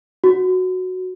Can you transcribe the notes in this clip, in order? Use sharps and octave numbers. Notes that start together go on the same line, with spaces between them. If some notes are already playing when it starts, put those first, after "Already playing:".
F#4